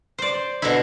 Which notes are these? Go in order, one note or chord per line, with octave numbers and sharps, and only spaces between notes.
C5 D5
B2 D3 E4